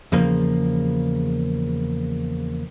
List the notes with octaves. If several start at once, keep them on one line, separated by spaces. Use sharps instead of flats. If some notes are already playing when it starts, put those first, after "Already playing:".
E2 C#3 F3 A#3